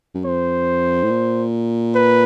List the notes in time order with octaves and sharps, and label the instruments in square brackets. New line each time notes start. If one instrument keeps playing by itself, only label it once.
[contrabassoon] F#2
[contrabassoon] F2 [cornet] C5
[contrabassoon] A2
A#2
[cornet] B4